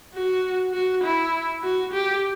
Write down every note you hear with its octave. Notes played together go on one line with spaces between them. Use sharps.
F#4
F#4
E4
F#4
G4